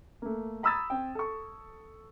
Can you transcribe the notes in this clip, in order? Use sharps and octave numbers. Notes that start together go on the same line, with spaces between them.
A3 A#3
A#5 B5 D#6 E6 G#6 A6
C4 G5
A4 C#6